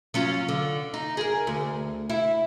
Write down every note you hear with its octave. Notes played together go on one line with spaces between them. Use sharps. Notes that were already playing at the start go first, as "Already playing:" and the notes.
F#3 C#4 F4
D3
D#4
G#4 A#4
D2
E4